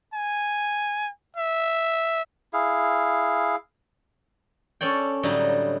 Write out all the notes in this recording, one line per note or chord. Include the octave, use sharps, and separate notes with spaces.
G#5
E5
E4 G#4 F5
C#4 A4 C#5 D5 G5
A2 D3 F#3 G3 D#4